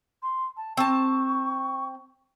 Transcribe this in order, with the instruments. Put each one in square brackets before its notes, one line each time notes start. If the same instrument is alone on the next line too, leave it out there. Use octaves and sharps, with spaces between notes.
[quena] C6
A5
[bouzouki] C4 A5 [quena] C#6